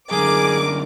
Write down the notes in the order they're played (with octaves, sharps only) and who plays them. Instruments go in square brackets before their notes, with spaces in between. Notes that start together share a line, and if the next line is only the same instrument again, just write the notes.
[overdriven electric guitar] F#2 D3 [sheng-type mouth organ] G#4 [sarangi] A#4 [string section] D6